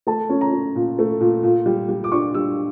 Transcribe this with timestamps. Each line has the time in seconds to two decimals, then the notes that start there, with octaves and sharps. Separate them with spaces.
0.07 A3 A5
0.29 C#4
0.41 A#5
0.53 C#4
0.76 A#2
0.99 A3
1.20 A#2
1.43 A#2
1.66 G3
1.89 G3
2.04 D6
2.12 D4 C#6
2.34 G3 E6